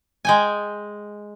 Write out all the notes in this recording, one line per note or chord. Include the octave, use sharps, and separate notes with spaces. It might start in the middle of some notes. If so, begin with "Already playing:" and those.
G#3 G5 G#5